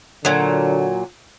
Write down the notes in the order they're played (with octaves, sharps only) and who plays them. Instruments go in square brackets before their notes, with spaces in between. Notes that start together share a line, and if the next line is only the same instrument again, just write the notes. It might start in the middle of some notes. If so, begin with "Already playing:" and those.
[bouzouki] A#2 F#3 [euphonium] D3